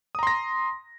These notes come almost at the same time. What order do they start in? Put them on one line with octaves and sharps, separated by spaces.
D#6 A#5 C6 A#6